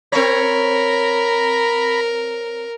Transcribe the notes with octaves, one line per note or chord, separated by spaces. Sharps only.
C4 A#4 C#5 A#5 B5